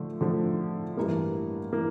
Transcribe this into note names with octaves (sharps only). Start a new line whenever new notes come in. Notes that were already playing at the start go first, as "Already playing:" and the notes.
Already playing: D3 F3 A3
D3 F3 A3
A1 G2 E3 A#3
E3 A#3